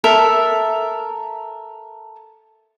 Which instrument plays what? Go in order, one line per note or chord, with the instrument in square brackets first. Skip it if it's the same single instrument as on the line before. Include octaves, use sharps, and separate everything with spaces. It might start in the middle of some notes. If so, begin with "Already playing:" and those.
[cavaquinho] A4 A#4 E5